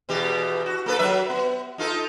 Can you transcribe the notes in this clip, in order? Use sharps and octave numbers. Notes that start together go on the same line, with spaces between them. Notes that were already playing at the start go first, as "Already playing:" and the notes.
E2 B2 G4
F#4
A#3 A4 B4
F#3 B4 E5
B3
D#4 F4 A4